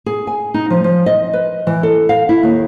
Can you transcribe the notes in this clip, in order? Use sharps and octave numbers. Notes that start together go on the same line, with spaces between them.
G#4
G#5
D#4
F3
F3
D#5
B4
E3
A4
F5
E4
D#2